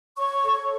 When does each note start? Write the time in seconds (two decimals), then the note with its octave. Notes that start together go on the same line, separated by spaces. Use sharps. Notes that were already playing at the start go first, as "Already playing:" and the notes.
0.17 C#5 C#6
0.44 A4